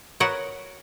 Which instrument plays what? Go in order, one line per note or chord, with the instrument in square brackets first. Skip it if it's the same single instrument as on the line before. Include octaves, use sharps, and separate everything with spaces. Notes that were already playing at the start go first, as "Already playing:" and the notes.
[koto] F#4 A#4 B4 C#5 D#5 F#5